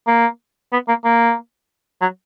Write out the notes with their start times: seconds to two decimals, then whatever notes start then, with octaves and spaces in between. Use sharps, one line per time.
0.07 A#3
0.72 B3
0.88 A#3
1.04 A#3
2.02 F#3